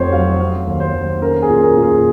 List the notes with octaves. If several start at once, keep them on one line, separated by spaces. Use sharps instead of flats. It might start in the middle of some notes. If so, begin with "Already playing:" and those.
Already playing: F1 F2 C5 C#5
F#3 F5
C4 F5
D#2
C5
D#2
C#4 A#4
G#4
A#2
A#4
A#2
G#4